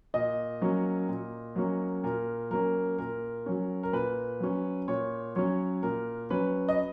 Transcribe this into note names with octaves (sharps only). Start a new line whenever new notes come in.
A#2 D#5
F#3 A#3 C#4
A#2
F#3 A#3 C#4
A#2 A#4
F#3 A#3 C#4 A#4
A#2 A#4
F#3 C#4
A#4
A#2 B4
F#3 C#4
A#2 C#5
F#3 C#4 C#5
A#2 A#4
F#3 C#4 B4
D#5